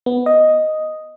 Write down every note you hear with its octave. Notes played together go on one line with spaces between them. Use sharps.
B3
D#5